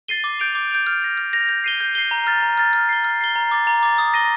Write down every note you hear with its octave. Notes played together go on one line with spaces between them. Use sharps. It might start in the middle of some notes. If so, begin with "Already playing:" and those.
A6 C7 D#7 G7
D6
G6 D7 F7
D6
G6 D7 F7
F6
A#6 F7
F6
A#6 F7
G6
C7 D#7 G7
G6
C7 D#7 G7
A#5
F6 A6
A#5
F6 A6
F6
C7 G7
F6
C7 G7
A#5
D6 A6
A#5
D6 A6
D#6
A#6 D#7 G7